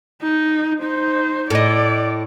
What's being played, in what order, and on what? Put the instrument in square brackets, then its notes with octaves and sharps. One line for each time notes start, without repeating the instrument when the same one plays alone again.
[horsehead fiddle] D#4
D#4 C5
[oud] A2 D#5 [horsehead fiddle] D5